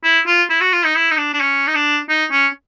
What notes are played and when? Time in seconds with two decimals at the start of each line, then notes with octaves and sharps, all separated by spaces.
0.04 E4
0.27 F4
0.50 E4
0.61 F#4
0.73 F4
0.85 D#4
0.96 E4
1.11 D#4
1.17 D4
1.34 D4
1.41 C#4
1.67 D#4
1.75 D4
2.09 D#4
2.31 C#4